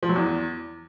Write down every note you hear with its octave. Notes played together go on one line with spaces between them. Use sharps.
F3
F#3
E2